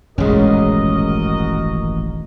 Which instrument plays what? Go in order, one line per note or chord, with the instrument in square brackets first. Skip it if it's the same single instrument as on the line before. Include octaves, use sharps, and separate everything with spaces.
[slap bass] D#1 A1 G2 [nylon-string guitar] G#3 C#4 [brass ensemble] F#4 A#4 D#5